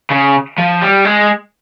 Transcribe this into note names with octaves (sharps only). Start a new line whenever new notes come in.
C#3
F3
G3
G#3